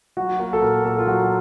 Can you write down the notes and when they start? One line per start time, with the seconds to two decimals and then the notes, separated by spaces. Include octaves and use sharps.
0.17 F#3 F#4
0.40 A#3 F#4
0.53 A4
0.62 A#2 A#4
0.85 A#2 A4
0.98 F4
1.06 F#3 F#4